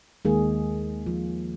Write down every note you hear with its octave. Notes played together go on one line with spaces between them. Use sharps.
D#2 D#3 G#3 A#3 G#4
F3 F4